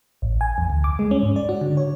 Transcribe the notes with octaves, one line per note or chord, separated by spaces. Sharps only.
A1
G#5
E2
D2
D6
G#3
C#4
G#2
D5
F#4
D3
C#5